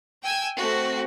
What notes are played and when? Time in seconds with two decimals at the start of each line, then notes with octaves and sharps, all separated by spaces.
0.22 G5 G#5 E6 G#6
0.57 A3 C4 F#4